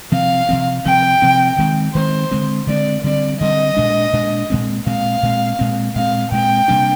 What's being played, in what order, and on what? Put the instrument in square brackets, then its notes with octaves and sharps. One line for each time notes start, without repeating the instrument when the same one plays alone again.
[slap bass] C3 F3 C4 [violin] F5
[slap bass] C3 F3 C4
[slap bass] C3 F3 C4 [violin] G5
[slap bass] C3 F3 C4
D#3 G#3 C4
[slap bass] D#3 G#3 C4 [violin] C5
[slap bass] D3 G#3 C4
[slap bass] D3 G#3 C4 [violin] D5
[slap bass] D3 G3 C4 [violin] D5
[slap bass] D3 G3 C4 [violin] D#5
[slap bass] A#2 G#3 D4
A#2 G#3 D4
A#2 G#3 C4
[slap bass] A#2 G#3 C4 [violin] F5
[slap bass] A#2 G#3 C4
A#2 G#3 C4
[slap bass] A#2 G#3 C4 [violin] F5
[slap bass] A#2 G#3 C4 [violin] G5
[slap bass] C3 G3 A#3 D4